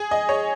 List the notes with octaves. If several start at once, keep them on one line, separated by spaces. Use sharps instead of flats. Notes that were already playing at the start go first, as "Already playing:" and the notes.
Already playing: G#4
D#5
C#5